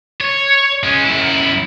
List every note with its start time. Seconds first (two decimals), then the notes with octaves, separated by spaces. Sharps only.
0.21 C#5
0.83 G#3 C#4
1.05 F#2 E4